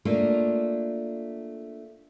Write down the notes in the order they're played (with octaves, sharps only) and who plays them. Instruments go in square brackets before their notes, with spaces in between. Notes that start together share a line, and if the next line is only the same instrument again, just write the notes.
[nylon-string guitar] A3 A#3 D4 F4